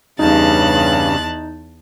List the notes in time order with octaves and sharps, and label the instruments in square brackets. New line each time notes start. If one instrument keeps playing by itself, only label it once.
[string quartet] E2 A5 F#6 [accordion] G2 C#3 [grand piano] D#4